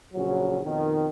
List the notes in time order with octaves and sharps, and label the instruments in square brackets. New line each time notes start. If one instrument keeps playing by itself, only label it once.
[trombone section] A#1 C#3 F#3
F2 B2 D#3